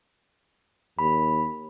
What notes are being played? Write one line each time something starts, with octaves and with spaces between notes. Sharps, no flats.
D#2 B5